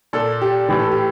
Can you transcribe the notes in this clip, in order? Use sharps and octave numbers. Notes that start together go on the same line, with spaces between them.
A#2 A4
G4
A2 E3 G4
A4
G4